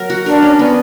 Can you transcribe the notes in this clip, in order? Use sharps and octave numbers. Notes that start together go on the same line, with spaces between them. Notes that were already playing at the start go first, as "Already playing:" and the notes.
Already playing: F#3 A#4
F#4
D4 A#4
C#4
B3